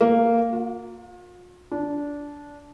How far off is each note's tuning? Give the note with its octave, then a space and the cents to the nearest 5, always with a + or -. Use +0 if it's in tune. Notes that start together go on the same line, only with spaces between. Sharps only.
A#3 -10
F4 +45
D4 -15